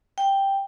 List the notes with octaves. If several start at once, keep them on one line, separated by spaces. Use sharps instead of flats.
G5